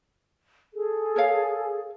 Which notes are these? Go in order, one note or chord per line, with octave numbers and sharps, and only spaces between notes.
G#4 A4
A#4 C#5 F5